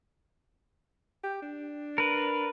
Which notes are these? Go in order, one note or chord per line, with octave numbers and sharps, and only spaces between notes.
G4
D4
A#4 B4